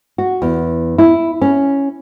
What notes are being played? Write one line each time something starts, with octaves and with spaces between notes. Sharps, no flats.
F#4
E2
E4
C#4